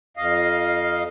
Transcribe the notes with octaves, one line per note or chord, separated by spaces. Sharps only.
F2 D#5 F5